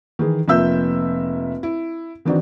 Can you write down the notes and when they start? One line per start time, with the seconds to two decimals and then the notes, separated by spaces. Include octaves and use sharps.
0.19 D#3 E3 G#4
0.48 F1 F3 A#3 E5 E6 G6
1.63 E4
2.25 D#3 E3 C4 D4 D#4 F#4